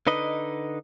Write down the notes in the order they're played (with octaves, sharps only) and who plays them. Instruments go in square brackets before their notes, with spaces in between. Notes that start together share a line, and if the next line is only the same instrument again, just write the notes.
[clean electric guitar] D3 D#4 B4 D#5